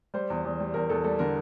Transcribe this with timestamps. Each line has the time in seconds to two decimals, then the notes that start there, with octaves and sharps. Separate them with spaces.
0.14 G3 C5
0.30 E2
0.45 E2
0.60 G3
0.74 E2 A#4
0.89 E2 A4
1.04 G3 A4
1.19 D3 A#4